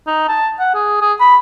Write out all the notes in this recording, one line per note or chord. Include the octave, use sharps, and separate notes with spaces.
D#4
A5
F#5
G#4
G#4
B5